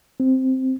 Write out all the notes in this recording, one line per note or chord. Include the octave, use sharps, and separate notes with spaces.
C4